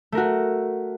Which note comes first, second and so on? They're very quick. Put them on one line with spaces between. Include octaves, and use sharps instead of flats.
A3 A#4 F#4